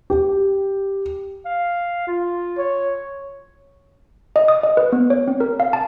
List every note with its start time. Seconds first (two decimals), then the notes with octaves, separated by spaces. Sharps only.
0.10 G4
1.45 F5
2.07 F4
2.58 C#5
4.36 D#5
4.48 D#6
4.63 D#5
4.77 B4
4.92 B3
5.10 C#5
5.28 C4
5.40 A#4
5.60 F5
5.73 A5